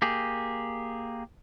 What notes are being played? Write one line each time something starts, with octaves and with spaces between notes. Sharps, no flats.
A#3 G4 G#4